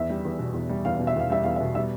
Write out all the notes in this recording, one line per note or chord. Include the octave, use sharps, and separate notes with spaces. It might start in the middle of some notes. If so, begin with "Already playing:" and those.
Already playing: E2 E5
G3
E2
B2
E2
G3
E2 F5
B2
E5
E2 F5
G3 E5
E2 F5
E5
B2
G3 E5